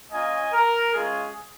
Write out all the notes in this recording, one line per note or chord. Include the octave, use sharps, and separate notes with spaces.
A#3 C#4 F4 D#5 G#5
A#4
G#3 C#4 F4 G#4